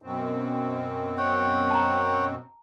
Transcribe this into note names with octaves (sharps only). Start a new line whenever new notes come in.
F#2 B2 C4
C#5 F#5 G5
A5 A#5